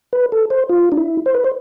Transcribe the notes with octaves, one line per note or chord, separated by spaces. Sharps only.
B4
A4
C5
F4
D4
E4
C5
B4
C5